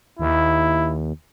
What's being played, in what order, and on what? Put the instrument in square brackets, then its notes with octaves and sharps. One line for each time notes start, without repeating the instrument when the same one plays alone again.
[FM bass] D#2 [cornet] E4